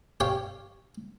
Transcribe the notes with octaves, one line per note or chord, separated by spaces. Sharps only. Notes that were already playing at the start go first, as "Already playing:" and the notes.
G4 C#5 F5 G5